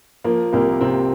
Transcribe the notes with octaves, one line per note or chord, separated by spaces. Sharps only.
F3 A#3
C2 A#3
C3 C4